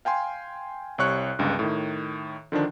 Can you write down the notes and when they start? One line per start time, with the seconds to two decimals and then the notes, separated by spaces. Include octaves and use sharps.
0.05 F5 G5 G#5 C6
0.98 C2 C3 C#5 C#6 F#6
1.39 G1 C#2 G2
1.59 A2 D#3
2.52 D3 D#3 F3 D4